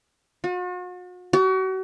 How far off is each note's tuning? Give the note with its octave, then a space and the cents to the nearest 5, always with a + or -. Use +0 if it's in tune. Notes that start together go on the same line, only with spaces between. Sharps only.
F#4 -45
F#4 +35